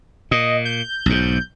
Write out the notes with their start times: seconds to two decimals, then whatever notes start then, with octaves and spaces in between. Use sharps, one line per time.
0.31 A#2 D#5
0.65 G6
1.06 B1 G#2